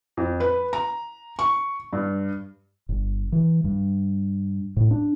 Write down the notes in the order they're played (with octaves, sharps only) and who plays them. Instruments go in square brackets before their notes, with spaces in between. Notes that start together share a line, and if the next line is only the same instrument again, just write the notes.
[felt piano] F2
B4
A#5
C#6
G2
[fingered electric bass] G1
E3
G2
A2
D4